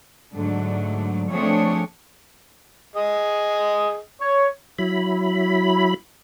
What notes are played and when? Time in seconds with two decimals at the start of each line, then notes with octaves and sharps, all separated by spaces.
0.34 G#2 D3 F#3 A3 D4
1.30 F3 A3 C4 D4 G#4 C#5
2.96 G#4 D#5
4.21 C#5
4.79 F#3 E4 B5